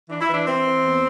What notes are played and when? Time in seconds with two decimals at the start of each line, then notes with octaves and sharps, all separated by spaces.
0.09 E3 D4
0.21 E4
0.29 E3 D4
0.47 E3 C4
0.66 E3
0.84 E2